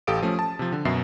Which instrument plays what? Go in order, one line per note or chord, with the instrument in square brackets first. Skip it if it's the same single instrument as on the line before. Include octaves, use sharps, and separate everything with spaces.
[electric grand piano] A1 G4 A4 F5 D#6 D7
F3 A3 C#4
A5
C3 F3
D3
F#2 B2 E5 C7